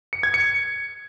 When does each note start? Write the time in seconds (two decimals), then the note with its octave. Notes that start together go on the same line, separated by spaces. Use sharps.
0.13 C#7
0.23 G#6
0.34 C#7